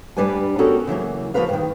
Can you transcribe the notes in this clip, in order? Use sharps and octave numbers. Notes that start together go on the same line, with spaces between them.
G2 G3 D4 B4 D5 G#5
B3 C#4 F#4 G4 A4 A#4
C#3 E3 F#3 A#3
F3 A#3 F#4 A#4 B4 F5
G2 D#3